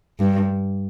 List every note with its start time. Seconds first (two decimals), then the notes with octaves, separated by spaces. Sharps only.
0.19 G2